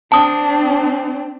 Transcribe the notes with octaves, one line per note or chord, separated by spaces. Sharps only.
C4 D4 A5 D#6